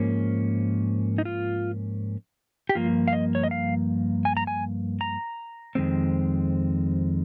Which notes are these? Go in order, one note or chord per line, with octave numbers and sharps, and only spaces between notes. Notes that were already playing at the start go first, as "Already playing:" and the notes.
Already playing: G#2 F3 A#3 C#4
D#4
F4
G4
G2 F3 A#3 F4
F5
D#5
C#5
D#5
F5
G#5
A#5
G#5
A#5
F2 D#3 G#3 C4